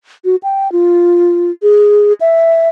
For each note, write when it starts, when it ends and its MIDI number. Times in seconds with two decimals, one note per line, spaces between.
0.25 0.36 66
0.43 0.71 79
0.72 1.51 65
1.63 2.13 68
2.21 2.69 76